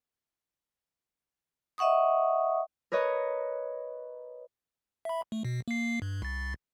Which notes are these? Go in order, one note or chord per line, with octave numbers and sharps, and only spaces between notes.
D#5 E5 F#5 C#6 D#6
A#4 B4 C#5 D#5
E5 B5
A3
B2
A#3 C7
G2
C2 A6